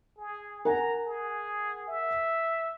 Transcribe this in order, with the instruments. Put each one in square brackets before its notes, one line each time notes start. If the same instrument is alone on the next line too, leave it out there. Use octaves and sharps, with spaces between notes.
[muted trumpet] G#4
[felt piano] A#4 F#5 G#5 [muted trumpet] A#5
[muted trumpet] G#4
E5